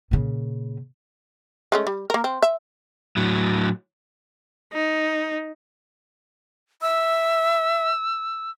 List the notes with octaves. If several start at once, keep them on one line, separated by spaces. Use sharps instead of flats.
A#2 C#3
G#3 A3 C#4
G3
A#3 A#4
C4
E5
A2 F#3
D#4
E5 E6